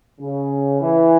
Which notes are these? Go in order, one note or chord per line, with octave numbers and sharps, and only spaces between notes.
C#3
E3